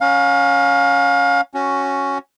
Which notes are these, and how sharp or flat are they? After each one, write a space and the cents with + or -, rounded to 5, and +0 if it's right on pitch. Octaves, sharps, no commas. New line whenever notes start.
C#4 +0 F5 +30 A#5 +0
C#4 +0 F#4 +0